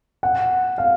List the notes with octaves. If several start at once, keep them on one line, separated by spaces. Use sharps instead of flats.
F#5
F5